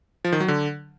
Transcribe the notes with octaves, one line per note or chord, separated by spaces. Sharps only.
F3
D#3
F#3
D3